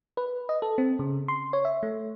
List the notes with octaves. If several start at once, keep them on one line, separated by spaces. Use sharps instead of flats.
B4
D#5
A4
C4
C#3
C6
C#5
E5
A3